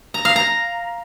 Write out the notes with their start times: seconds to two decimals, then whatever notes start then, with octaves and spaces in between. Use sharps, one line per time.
0.14 A#5
0.25 F5
0.36 A#5